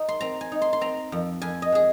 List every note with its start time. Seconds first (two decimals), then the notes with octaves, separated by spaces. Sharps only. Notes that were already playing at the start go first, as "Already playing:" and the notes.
Already playing: D#4
0.09 C6
0.21 C4 A#5
0.41 G#5
0.52 D#4
0.62 C6
0.73 C6
0.81 C4 A#5
1.12 F2
1.42 F2 G#5
1.62 D#5
1.72 G#3 G#4